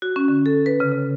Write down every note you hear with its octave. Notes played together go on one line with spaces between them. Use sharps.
F#4
C#4
D3
A4
B4
C#3
C#3